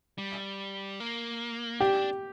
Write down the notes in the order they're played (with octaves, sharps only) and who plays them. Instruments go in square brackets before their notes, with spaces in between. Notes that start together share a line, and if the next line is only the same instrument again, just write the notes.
[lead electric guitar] G3
A#3
[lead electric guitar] D4 [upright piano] G4